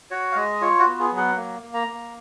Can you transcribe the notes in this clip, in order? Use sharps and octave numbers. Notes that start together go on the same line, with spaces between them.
F#4 C#5
F5
G#3 D#5
F4 C#5
F#4
B3
G#4
F#3
F#5
A#3
A#3
A#5
A#3